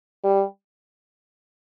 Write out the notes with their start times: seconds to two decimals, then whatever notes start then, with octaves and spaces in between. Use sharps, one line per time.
0.24 G3